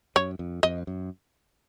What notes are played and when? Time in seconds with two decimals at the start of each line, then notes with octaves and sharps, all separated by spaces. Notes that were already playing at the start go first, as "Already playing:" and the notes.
0.16 F#2 C#5
0.39 F2
0.63 F2 D#5
0.87 F#2